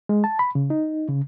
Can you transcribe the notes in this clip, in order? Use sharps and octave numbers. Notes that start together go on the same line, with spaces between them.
G#3
A5
B5
C#3
D#4
C#3